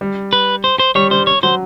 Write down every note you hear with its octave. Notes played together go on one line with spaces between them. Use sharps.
G3
B4
C5
C5
G3 C#5
G3 C5
C#5
F#3 C5